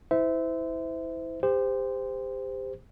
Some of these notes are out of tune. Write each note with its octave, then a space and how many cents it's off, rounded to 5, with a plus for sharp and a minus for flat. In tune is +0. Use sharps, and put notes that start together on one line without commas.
E4 -20 C5 -30 E5 -15
G4 +30 C5 -15